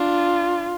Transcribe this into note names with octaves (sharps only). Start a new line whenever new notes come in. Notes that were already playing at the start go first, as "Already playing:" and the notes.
Already playing: D4 F4